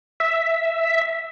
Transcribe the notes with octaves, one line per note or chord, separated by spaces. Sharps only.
E5